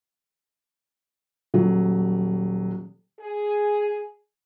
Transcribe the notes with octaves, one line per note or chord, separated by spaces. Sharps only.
D#1 F#3
G#4